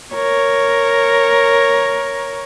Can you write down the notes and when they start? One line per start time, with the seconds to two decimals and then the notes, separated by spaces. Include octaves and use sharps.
0.14 A#4 C#5